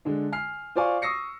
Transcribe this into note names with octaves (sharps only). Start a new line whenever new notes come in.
D3 G#3 D4
G#5 F6 C7
F4 C5 D5 F5 G#5 C#6
C#6 D#6 E6 A#6 C7 C#7